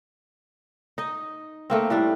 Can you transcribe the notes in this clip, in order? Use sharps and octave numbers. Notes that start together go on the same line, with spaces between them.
D#4 D#5
A3 A#3 C4
A2 G3 D4